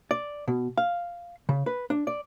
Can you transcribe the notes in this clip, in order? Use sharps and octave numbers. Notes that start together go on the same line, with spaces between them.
D5
B2
F5
C#3
B4
D4
D5